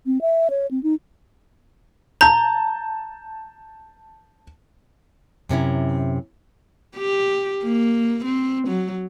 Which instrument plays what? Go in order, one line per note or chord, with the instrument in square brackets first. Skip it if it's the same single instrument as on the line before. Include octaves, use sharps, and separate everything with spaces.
[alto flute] C4
E5
C#5
C4
D#4
[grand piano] A5 G6 [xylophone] A#5
[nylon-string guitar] F#2 C3 C#4 E4
[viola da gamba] G4
A#3
C4
F#3